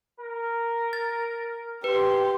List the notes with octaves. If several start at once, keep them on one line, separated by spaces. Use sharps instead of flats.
A#4
A6
G4 B4 C6